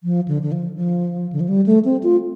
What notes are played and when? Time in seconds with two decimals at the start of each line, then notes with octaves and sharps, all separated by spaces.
0.04 F3
0.28 D3
0.42 D3
0.52 F3
0.76 F3
1.33 D3
1.40 F3
1.49 G3
1.66 A3
1.85 C4
2.03 F4